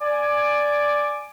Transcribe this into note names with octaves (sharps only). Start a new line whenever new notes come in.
D5 G#5 D6